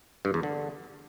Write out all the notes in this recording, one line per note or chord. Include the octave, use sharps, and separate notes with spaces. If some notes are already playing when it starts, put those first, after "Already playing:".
G2
E2
D3